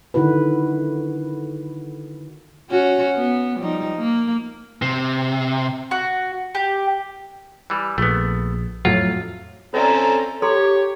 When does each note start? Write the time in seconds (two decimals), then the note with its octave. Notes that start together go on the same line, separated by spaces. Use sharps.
0.14 D3 D#3 E4 F#4 B4
2.71 C#4 F#4
3.16 B3
3.58 F3 G3 D#4
3.97 A#3
4.82 C3
5.91 F#4
6.55 G4
7.70 E3 G3
7.98 A#1 A3 B3
8.85 F2 A2 F#3 F4
9.74 C4 C#4 A4 C#5 D5 E5 A#5
10.42 G4 A4 C#5 A#5 C6